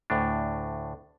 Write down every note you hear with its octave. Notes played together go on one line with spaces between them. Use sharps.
D2 A2 D4